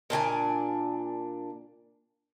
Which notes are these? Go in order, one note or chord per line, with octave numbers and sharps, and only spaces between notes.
A#2 D4 F4 G#5